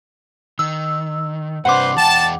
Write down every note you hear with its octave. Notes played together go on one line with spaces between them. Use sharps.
D#3 E6
G2 C3 D4 B4 C5 F#5 C6 D6
E2 G5 A5